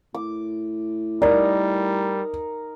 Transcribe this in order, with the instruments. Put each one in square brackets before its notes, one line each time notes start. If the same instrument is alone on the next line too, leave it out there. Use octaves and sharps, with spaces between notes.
[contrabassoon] A2 [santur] D6
[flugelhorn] G3 [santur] D#4 A#4 [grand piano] D5